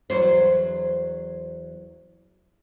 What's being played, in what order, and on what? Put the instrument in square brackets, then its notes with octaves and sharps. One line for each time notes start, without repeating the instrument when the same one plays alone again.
[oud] E2 F#3 C5